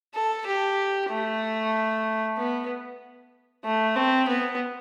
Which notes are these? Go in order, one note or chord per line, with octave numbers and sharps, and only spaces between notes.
A4
G4
A3
B3
A3
C4
B3